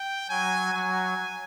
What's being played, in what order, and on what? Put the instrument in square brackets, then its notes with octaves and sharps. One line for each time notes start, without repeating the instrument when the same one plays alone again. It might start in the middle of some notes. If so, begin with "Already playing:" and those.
Already playing: [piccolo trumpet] G5
[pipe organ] F#3 [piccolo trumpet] G#5
[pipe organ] F#3 [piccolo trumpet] G#5